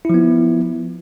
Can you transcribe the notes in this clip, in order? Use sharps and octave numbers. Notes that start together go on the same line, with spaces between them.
F3 B3 E4